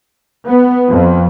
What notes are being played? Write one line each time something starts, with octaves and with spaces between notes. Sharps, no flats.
B3
F2